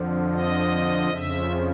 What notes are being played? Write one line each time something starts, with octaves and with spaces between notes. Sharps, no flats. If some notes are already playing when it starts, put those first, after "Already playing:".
Already playing: F2 D3 F3
D#5
F2 C#3 F3 E5